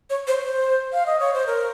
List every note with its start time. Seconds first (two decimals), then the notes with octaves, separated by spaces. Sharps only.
0.10 C#5
0.27 C5
0.44 C5
0.93 F5
1.06 D#5
1.20 C#5
1.33 C5
1.46 A#4